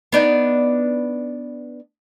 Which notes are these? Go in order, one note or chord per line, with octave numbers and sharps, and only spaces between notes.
B3 D4 D#4